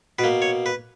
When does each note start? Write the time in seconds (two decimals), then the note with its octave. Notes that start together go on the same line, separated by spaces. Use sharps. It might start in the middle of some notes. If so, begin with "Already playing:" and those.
0.19 B2 B4
0.24 A#3
0.42 C#5
0.66 B4